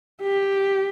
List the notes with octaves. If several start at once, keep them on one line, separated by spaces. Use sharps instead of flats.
G4